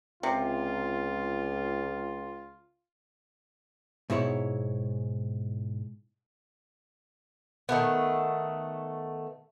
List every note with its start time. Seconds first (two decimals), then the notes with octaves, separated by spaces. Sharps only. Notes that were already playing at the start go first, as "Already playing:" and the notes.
0.23 C#2 C3 F4
4.10 G#2 B2 E4 C#5
7.69 D#3 A3 B3